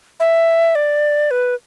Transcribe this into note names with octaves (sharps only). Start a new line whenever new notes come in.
E5
D5
B4